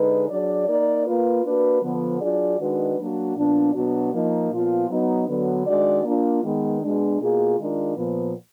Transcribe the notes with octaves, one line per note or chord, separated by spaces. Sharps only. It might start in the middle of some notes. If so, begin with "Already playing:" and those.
Already playing: D3 G#3 D#4 G#4 B4
F#3 D4 G#4 D5
A#3 D#4 A#4 D5
A#3 F4 B4
A#3 D4 F#4 B4
D3 F3 B3
F#3 D4 F4 G#4 D5
D#3 G#3 D4 F#4 B4
F#3 A#3 D4 F#4
A#2 F3 B3 D4
B2 F#3 B3 D4 F#4
F3 A#3 D#4
A#2 F3 B3 F4
F#3 B3 D#4
D3 F#3 B3
D#3 G#3 D4 F#4 D5
A#3 D4 F4
D#3 G#3 B3
B2 G#3 D4
B2 A#3 F4 G#4
D#3 G#3 D4 F4 A#4
A#2 F3 B3